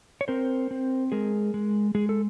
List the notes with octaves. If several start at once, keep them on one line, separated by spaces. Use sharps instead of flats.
C#5
C4 A#4 C5
C4
G#3 G#4 A#4
G#3
G#3 G#4
A4